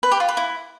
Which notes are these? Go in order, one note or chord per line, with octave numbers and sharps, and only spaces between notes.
B4
G4
F4
B4
E4